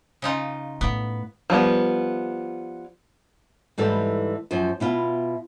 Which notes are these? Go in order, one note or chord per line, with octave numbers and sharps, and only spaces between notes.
C#3 D#4 F4
A2 B3
F3 G3 B3
G#2 E3 G3 A4
F#2 F3 C5
B2 E4 F4